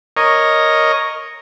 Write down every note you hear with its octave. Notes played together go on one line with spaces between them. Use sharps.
A#4 C#5 D#5